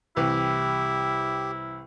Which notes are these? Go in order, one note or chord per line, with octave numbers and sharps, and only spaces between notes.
C2 E3 E4 G4